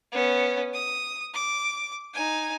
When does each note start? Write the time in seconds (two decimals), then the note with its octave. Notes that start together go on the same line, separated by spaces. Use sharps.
0.12 B3 C#4
0.74 D#6
1.34 D6
2.14 D#4 G#5